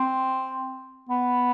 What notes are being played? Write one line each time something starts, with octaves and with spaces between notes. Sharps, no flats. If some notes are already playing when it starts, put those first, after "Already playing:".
Already playing: C4
B3